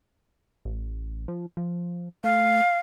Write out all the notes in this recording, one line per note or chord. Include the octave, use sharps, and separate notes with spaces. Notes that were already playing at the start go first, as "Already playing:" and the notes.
A1
F3
F3
A3 F5